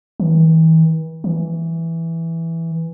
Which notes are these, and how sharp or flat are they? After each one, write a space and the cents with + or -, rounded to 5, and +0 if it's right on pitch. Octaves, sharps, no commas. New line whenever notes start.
E3 -40
E3 +0